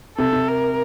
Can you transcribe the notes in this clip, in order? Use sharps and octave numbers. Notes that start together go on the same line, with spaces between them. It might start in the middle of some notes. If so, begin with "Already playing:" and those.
C3 A4
C3
A#4